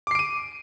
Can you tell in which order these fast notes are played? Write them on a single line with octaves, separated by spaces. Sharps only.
D6 C7 D7 D#7